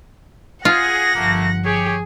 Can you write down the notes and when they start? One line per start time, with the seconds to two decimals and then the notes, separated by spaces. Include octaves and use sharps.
0.65 F4 G#4 F#5 A#6
1.15 G1 F3 A3 A#3
1.65 G4 G#4 C#5